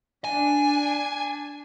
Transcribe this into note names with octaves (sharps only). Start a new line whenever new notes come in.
D4 G#5